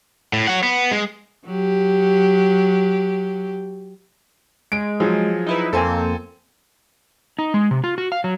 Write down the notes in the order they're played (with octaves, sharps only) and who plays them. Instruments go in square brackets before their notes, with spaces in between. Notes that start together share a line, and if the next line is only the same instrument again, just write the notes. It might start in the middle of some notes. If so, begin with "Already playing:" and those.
[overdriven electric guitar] A2
C#5 F#5
B3
G#3
[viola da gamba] F#3 G4
[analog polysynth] G#3 [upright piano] D7
[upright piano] F3 F#3 G#4
[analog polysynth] D#4 E4 B4
[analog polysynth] F2 A#3 C4 [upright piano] A4 C5 G#5
[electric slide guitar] D#4
G#3
C3
F4
F#4
F5
F#3